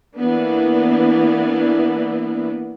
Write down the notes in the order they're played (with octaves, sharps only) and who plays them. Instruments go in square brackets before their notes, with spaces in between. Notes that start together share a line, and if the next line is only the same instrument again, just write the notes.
[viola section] E3 A#3 B3 D4